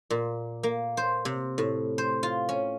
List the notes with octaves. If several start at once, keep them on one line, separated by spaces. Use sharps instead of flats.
A#2
A#3
C5
C3
A2
C5
F4
C#4